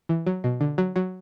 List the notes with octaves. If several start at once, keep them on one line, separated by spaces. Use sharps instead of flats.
E3
F#3
B2
D3
F#3
F#3